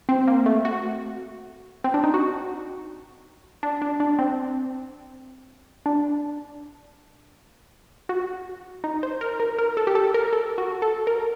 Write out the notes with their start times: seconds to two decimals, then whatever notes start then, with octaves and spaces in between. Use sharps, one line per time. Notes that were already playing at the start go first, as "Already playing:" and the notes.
0.09 C4
0.28 A#3
0.46 A3
0.65 F#4
1.84 C4
1.94 D4
2.04 D#4
2.14 F#4
3.63 D4
3.82 D4
4.00 D4
4.19 C4
5.86 D4
8.09 F#4
8.84 D#4
9.03 C5
9.21 A#4
9.40 A#4
9.58 A#4
9.77 A4
9.87 G4
9.95 A4
10.14 A#4
10.33 A4
10.58 F#4
10.82 A4
11.07 A#4